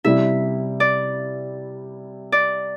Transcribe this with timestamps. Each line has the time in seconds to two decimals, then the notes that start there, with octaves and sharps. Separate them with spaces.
0.04 C3 G3 E4 E5
0.80 D5
2.32 D5